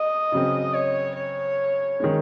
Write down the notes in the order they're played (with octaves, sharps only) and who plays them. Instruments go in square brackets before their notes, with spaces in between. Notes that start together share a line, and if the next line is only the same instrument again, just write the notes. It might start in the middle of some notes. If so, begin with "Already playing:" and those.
Already playing: [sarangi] D#5
[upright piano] C#3 F#3 C4
[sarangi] C#5
C#5
[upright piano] D#3 G#3 C#4